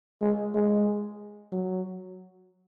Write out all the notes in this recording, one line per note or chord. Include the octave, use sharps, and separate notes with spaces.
G#3
G#3
F#3